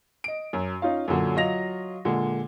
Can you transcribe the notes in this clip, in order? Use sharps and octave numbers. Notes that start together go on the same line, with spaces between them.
D#5 D7
F#2
C#4 D#4 F4 F5
F#2 A#2 D3 F#3
F#3 F4 D#5 A#6 F7
A#2 D3 G#3